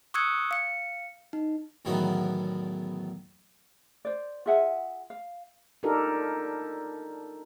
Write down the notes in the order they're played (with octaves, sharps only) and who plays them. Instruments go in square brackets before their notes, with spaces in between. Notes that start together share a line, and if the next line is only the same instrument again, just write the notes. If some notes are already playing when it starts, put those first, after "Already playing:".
[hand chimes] C#6 D#6 E6 F#6 G#6 C#7
F5 C#7
D#4
[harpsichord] E2 A2 D#3 F#3 B3
[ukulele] C5 D5
F4 G#4 E5 F#5
F5
[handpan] D4 D#4 F4 G4 A4 A#4